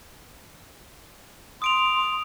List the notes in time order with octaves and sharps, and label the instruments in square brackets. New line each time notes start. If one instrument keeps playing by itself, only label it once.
[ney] C6 [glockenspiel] D#6 D7 F7